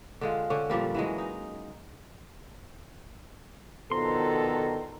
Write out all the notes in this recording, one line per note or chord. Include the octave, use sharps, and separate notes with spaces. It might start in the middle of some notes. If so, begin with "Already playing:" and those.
D3 G#3 F4
D3 C#4
A#2 F3 G3 A#3
E3 F#3 G#3
D#4
B2 D3 D#3 F3 A4 A#5 C6